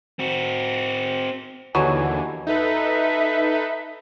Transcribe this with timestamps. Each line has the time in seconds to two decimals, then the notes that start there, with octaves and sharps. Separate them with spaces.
0.19 C4 F#4
1.75 D#2 B2 D3 E3 F#3 G#5
2.47 D#4 A4 B4 E5